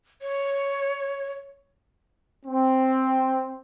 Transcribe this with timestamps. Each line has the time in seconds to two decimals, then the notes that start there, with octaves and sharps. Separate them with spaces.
0.22 C#5
2.46 C4